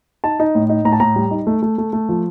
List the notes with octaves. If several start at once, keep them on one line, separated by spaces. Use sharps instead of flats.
D#4 A5
D#4
A2
D#4
A2 A#5
A5
A2 A#5
G3
D#4
A3
A3
A3
A3
F3